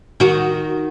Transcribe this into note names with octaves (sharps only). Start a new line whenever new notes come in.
D#3 F#4